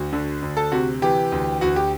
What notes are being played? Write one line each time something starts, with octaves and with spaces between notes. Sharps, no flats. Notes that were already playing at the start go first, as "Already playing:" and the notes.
Already playing: D2 F#4
D3
D2
A4
C3 F#4
E3 G4
D2
D2 F#4
G4